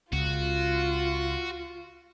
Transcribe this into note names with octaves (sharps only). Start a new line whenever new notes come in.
C#2 F4 F#4